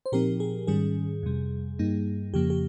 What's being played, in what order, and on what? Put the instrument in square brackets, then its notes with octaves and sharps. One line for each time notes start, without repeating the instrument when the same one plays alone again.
[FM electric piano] C5
A#2 F3 C4 D#4 G4 A#4
G#4
G#2 D#3 G3 C#4 G#4
F2 C3 G3
G2 G3 A#3 D#4
F2 C#3 F3 A#3 G4
G4